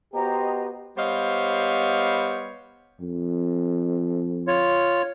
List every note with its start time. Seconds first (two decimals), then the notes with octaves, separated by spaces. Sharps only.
0.14 B3 F#4 G4 C5 D#5 A#5
0.97 G3 B3 C5 C#5 D#5 F5
3.01 F2
4.47 F4 C#5